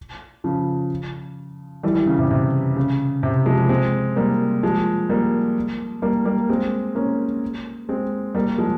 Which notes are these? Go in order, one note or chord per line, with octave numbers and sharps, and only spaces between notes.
C#3 F3
E3 G3
E3 G3
C#3
C3
C3
C#3
C3
F3 G#3
G#3 C4
G3 A#3
F3 G#3
G3 A#3
G3 A#3
G3 A#3
G#3 C4
A#3 C#4
G#3 C4
G3 A#3
F3 G#3